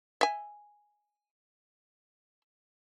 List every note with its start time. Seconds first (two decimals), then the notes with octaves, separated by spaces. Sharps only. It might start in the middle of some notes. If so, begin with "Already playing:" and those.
0.21 E5 G#5